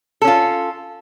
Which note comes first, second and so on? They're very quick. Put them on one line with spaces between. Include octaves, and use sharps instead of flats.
A4 C#4 F4